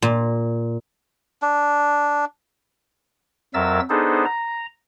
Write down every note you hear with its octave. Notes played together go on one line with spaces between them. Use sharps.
A#2
D4
F2 F#3 A#4 E5 E6 A6
B3 D4 D#4 G#4 A4 C5
A#5